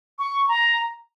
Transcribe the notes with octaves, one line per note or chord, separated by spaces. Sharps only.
C#6
A#5